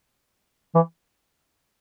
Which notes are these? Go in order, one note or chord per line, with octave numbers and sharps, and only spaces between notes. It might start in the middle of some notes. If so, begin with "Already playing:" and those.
E3